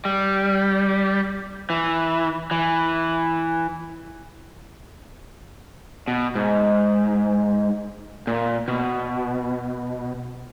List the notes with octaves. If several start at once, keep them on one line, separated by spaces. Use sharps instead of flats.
G3
E3
E3
B2
G#2
A#2
B2